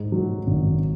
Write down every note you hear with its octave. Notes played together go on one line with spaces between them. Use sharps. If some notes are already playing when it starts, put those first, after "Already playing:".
Already playing: G#2
F#3
G#1